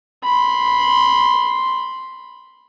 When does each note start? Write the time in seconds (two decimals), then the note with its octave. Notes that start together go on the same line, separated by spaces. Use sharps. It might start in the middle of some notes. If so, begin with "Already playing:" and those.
0.24 B5 C6